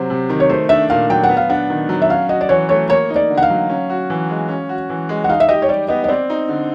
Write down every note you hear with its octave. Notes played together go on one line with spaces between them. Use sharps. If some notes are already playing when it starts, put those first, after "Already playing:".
Already playing: C3 F#3 C5
C3
D#3
C#5
A3 C5
D4 E5
A#2 F5
F#3 G5
F#5
B3
F5
D4 F#5
D#3
F#3
E5
C#4 F5
F#4 D#5
D5
E3 C#5
A3 C#5
A#3 C#5
D#4
D5
D3
F#5
F5
F#3
C#4
F#4
E3
G#3
C#4
F#4
E3
G#3
F#5
D#4 F5
E5
G4 D#5
C#5
G3 D5
B3 D#5
D#5
C4 D5
D#4
D3